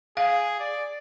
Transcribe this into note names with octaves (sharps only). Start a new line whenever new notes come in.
G#4 F5
D5